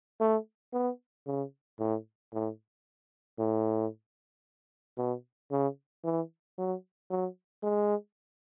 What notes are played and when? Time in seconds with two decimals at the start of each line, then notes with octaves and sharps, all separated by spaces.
0.20 A3
0.73 B3
1.27 C#3
1.79 A2
2.33 A2
3.39 A2
4.97 B2
5.51 C#3
6.04 E3
6.58 F#3
7.10 F#3
7.63 G#3